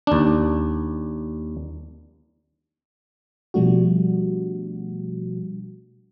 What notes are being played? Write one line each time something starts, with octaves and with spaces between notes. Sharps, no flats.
D#2 D4
B2 F3 G3 A3 D4 F#4